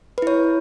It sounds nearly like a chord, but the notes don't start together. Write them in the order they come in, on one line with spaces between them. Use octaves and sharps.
B4 E4 C#5